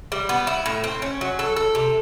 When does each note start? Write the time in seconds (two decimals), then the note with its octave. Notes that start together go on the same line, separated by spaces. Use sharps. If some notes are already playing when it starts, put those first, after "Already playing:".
0.12 G3
0.29 B3
0.47 E4
0.66 A2
0.84 C4
1.02 C#4
1.21 F#3
1.39 A4
1.56 A4
1.75 C3